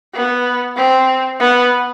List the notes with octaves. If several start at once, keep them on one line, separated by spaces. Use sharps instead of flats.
B3
C4
B3